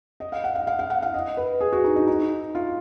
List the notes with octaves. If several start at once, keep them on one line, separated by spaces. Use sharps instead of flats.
D#5
F5
F#5
F5
F5
F5
F#5
F5
D#5
B4
G#4
F#4
D#4
D#4
D#4
F4